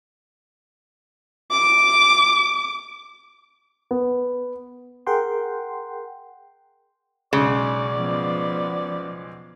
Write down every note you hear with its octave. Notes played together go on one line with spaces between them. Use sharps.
D6
B3
G#4 A#4 F#5 G5 C6
B1 C#3 G#3 D5
F3 B3